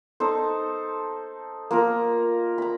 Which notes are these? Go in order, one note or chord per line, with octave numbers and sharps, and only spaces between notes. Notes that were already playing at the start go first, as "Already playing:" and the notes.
D#4 A4 C5
A#3 F4 A#4
A#5 B5